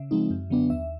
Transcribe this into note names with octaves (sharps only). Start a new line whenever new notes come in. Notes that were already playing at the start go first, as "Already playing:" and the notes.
Already playing: C#3 E5
F3 G#3 C4 D#4
F#2
D3 F#3 B3 D4
D#2 E5